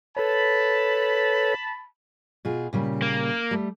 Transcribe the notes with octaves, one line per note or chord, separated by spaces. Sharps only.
A4 B4 C#5 A5 B5
B2 F4 G#4
A#2 C#3 G3
A#3
G3 A3